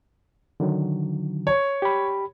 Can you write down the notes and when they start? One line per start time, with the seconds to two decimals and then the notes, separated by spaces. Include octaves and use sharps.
0.60 D3 D#3 F#3
1.47 C#5
1.82 G4 B5